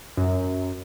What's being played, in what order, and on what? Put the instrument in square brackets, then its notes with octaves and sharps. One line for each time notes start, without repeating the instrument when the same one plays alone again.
[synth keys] F#2